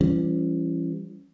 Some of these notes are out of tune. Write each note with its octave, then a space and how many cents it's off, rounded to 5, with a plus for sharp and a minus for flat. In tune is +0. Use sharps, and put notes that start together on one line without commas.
E3 +40 G3 +15 C#4 +0